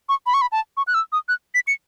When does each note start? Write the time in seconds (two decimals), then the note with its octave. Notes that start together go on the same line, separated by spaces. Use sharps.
0.09 C#6
0.27 B5
0.34 C#6
0.41 B5
0.52 A5
0.77 C#6
0.87 F#6
0.94 E6
1.12 D#6
1.29 F#6
1.55 B6
1.67 C#7